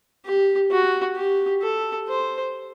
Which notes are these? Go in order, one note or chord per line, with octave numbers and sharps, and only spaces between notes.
G4
F#4
G4
A4
C5